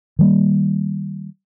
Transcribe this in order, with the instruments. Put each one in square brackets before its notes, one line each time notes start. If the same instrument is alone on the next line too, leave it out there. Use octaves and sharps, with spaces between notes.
[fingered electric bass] D#3 G3 A#3